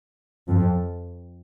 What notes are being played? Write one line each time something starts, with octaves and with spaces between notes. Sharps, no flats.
F2